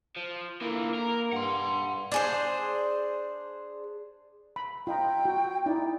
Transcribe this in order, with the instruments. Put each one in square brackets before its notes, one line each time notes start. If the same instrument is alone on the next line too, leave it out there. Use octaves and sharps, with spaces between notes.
[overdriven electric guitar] F3
[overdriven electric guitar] D3 E3 [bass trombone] A#3
[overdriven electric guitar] A#4
[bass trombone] G2 [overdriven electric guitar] F#5 C6
[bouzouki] D4 G#4 C5
[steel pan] B5
[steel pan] F4 D#5 A#5 [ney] G5
[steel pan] F#4
[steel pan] D#4 E4 [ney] D5